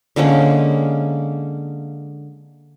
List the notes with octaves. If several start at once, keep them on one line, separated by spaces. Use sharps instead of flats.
D3 G#3 A#3 C#4